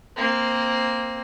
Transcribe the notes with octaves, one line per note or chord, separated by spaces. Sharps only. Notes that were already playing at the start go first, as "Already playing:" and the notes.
A#3 C4